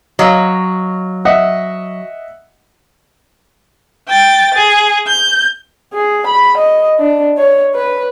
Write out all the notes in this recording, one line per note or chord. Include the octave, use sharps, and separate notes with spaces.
F#3 D#5 F5
D#5 E5 F#5
G5 A6
G#4
G6
G#4
B5
D#5
D4
C#5
B4